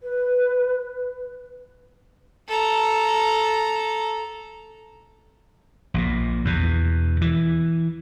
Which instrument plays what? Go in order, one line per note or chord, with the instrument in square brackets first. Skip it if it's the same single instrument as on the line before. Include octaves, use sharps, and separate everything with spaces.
[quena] B4
[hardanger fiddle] A4 A#5
[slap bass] A#1 A#2
E2 B2
E3